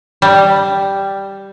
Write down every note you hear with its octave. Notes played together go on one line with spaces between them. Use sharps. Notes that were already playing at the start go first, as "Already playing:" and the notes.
G3